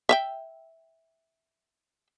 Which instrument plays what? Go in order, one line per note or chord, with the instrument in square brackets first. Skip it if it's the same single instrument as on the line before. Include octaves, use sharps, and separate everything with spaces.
[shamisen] E5 F5 G5